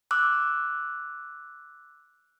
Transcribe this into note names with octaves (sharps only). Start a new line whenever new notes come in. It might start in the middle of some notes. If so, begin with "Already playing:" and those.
D6 E6 F#6